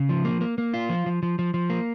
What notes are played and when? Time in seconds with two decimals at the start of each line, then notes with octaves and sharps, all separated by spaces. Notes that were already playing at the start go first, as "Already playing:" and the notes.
Already playing: C#3
0.09 F3
0.25 A#3
0.41 A#3
0.58 A#3
0.74 F4
0.90 F3
1.06 F3
1.23 F3
1.39 F3
1.54 F3
1.70 A#3